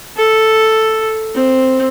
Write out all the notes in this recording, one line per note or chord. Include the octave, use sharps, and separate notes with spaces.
A4
C4